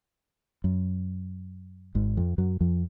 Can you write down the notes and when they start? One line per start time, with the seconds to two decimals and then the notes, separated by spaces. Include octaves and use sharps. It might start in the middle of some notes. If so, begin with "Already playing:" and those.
0.64 F#2
1.95 G#1 G#2
2.17 F2 F3
2.38 F#2 F#3
2.61 F2 F3